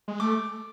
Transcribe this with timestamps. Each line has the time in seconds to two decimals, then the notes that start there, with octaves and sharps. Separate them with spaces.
0.08 G#3
0.20 A3 D6